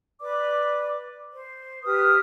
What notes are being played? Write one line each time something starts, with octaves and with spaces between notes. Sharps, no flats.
B4 D5 D6
C5
G4 B4 D#6 F6